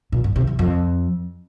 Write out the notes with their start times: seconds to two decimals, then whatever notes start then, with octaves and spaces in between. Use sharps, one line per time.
0.12 A#2
0.24 G2
0.36 C3
0.47 E3
0.59 F2